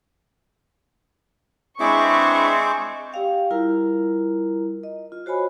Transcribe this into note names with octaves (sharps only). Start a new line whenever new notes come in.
G#3 C4 D4 E4 G#4 B4 C#6 D6
G4 D5 F5 G5
G3 E4 F4 A#4 A#5
D#5
F4
F#4 C5 C#5 G#5 B5